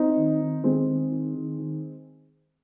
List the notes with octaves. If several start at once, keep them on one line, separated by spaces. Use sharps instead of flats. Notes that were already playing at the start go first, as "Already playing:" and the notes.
Already playing: C4 D#4
D#3
D#3
D#3 G#3 C4
D#3
D#3
D#3
D#3